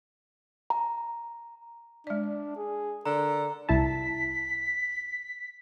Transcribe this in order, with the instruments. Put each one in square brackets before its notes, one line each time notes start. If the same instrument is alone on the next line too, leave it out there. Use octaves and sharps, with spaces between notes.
[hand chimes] A#5
[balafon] G#3 D5 [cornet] D4
[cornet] G#4
[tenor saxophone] D3 [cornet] A#4 [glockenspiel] A#5
[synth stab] C2 E4 A5 [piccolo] B6